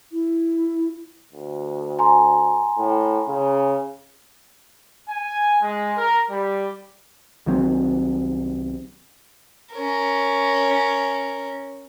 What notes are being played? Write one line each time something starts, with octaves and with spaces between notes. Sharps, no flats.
E4
D2
G#5 A#5 C6
A2
C#3
G#5
G#3
A#4
G3
C2 D#3 F#3 C4
C#4 A#4